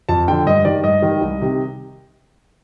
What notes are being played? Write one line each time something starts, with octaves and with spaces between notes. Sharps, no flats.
F2 A5
D3 F3 G5
G2 D#5
D#3 G3 D5
G2 D#5
D#3 G3
C2
C3 D#3